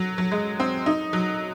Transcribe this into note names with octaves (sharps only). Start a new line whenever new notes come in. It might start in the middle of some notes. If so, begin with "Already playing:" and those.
Already playing: F#3
F#3
G#3
C4
D#4
F#3